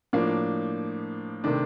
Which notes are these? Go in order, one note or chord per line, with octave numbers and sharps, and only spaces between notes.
A2 F3 A#3 D4
C3 D#3 A3 D4